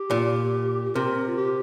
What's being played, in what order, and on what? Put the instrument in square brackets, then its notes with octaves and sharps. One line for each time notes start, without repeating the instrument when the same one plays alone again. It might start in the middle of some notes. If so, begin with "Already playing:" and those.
Already playing: [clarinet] G4
[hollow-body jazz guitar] A#2
[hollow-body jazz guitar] C3 [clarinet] A#4
[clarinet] F4
G4